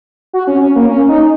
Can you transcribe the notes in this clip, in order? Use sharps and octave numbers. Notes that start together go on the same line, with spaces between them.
F#4
C#4
C#4
A#3
C#4
D#4